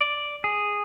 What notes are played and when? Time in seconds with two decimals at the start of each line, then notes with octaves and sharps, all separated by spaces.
0.01 D5
0.44 G#4